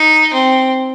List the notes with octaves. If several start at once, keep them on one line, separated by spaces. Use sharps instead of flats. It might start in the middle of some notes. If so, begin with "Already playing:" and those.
Already playing: D#4
C4